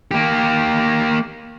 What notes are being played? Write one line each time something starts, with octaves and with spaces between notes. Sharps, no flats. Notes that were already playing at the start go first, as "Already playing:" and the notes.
A#3 G4